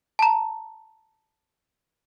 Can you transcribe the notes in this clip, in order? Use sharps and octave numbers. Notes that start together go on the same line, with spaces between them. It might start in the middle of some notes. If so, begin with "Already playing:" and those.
A5 A#5